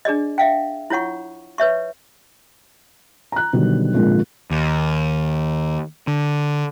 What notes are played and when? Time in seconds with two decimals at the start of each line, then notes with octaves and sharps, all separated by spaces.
0.05 D4 G#4 D5 D#5
0.38 E5 F5 G5
0.90 E4 F4 C#5 F#5 C#6
1.58 B4 C#5 E5 C#6
3.32 A#5 F#6
3.53 B2 D3 D#3 F#3 G3
3.94 G#1 A#2 D3 F3 G#3
4.51 D#2
6.07 D3